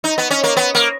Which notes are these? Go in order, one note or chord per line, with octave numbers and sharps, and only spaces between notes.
D#4
B3
C#4
A#3
B3
A#3